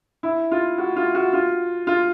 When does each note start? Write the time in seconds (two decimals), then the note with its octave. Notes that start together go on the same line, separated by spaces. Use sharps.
0.23 E4
0.51 F4
0.78 F#4
0.96 F4
1.15 F#4
1.33 F4
1.87 F4